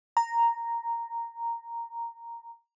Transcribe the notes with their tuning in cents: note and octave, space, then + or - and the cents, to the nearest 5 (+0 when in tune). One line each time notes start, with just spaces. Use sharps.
A#5 -5